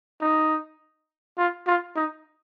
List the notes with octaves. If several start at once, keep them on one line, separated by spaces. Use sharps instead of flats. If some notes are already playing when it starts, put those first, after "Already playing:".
D#4
F4
F4
D#4